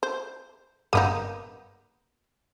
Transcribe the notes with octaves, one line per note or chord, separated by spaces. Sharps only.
C5
G1 G2 A#3 B3 D#4 D#6